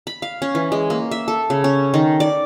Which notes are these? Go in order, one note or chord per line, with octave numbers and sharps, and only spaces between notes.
B5
F5
C#4
E3
G#3
A#3
E5
A4
C#3
C#4
D#3
D5